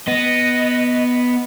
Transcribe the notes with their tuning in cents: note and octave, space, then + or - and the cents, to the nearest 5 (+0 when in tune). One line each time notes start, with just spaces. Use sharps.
B3 +0 D#5 +0